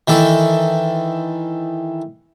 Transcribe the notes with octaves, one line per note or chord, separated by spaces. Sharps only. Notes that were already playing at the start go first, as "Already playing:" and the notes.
D#3 E3 A4